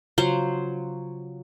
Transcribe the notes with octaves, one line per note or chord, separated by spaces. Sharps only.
C#3 F#3 F4 C5